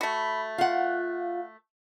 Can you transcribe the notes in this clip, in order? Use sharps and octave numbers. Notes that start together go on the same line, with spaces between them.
A3 F#4 B5
F4 F5 F#5